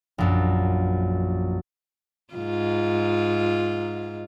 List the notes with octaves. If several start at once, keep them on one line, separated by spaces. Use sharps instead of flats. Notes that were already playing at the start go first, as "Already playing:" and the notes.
A#1 F#2
G#2 F4